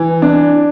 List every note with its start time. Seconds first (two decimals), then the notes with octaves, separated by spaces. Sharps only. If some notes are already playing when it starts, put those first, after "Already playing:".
Already playing: E3
0.22 D4